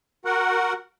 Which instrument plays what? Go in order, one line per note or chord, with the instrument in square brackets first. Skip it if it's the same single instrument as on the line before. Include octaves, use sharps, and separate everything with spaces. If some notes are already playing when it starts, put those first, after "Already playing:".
[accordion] F#4 A#4 F#5